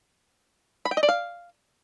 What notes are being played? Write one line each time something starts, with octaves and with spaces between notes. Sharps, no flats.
B5
G5
D#5
D5
F5